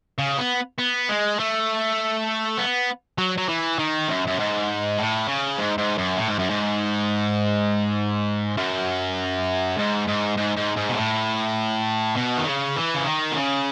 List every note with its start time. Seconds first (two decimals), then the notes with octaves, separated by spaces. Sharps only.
0.19 C#3
0.39 B3
0.79 B3
1.09 G#3
1.39 A3
2.58 B3
3.18 F#3
3.38 F#3
3.48 E3
3.79 D#3
4.08 F#2
4.27 F#2
4.39 G#2
4.98 A2
5.28 C#3
5.58 G#2
5.78 G#2
5.98 F#2
6.18 A2
6.28 G#2
6.39 F#2
6.50 G#2
8.57 F#2
9.77 G#2
10.07 G#2
10.37 G#2
10.57 G#2
10.77 G#2
10.89 B2
10.97 A2
12.17 B2
12.38 D#3
12.47 C#3
12.76 E3
12.95 C#3
13.06 D#3
13.32 B2
13.36 C#3